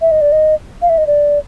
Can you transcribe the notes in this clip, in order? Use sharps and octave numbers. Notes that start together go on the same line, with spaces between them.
E5
D#5
D5
D#5
F5
E5
D#5
D5